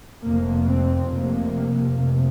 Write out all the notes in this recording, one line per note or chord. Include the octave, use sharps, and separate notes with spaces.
F1 F2 C3 A#3
C4
F1 F2 C3 A#3
F1 F2 C3